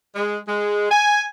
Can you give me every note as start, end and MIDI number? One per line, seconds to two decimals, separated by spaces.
0.16 0.38 56
0.48 0.88 56
0.91 1.24 80